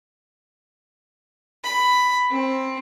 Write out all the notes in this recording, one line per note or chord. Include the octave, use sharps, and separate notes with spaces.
B5
C4